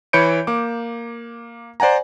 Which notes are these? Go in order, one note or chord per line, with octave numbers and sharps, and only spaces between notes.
E3 C#5 B5 G6 C#7 D7
A#3 D6
C5 D5 F#5 G#5 A#5